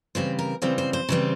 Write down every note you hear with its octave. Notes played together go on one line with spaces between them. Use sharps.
C#3 E3 G3 C4 C5
A#4
C#3 E3 G3 C4 C5
C5
C5
C#3 E3 G3 C4